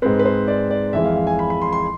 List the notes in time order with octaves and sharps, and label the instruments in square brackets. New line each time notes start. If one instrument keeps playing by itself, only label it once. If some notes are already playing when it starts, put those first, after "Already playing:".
[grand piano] G#2 G#3 C4 B4
B4
C5
D5
D5
F2 E3 G#3 E5
F5
F5
G#5
B5
B5
C6
C6